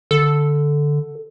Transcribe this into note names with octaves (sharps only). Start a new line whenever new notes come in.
D3 A4